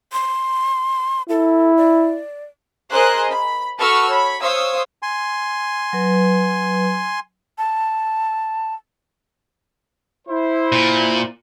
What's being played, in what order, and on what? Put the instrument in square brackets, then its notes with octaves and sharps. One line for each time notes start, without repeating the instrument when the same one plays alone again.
[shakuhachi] C6
[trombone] E4 [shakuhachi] A4
[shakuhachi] D5
[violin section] G#4 A#4 C5 D#5 F#6
B5
F#4 A4 B4 C#6 E6 F6
C#5 B5
C5 C#5 F5 D#6 E6
[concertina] G#5 C6
[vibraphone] F#3 B4
[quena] A5
[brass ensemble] E4 C5
[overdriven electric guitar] A#2